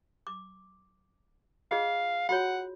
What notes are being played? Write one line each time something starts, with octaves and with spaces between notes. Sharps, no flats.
D6
F4 G#4 D#5 F5
F4 F#4 C#5 F#5